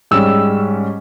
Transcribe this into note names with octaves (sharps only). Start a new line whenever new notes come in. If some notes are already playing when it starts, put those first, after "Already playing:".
G#2 G3 C#4 E6